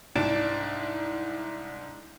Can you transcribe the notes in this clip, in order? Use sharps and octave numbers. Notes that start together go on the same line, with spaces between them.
C2 G#2 D4 A6 D7 E7